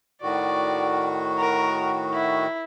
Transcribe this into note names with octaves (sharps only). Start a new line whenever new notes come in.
A2 D#3 F#4 D5
A#4
E4